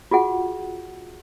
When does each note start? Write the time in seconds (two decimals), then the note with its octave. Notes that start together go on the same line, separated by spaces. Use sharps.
0.11 F4 F#4 G#4 F#5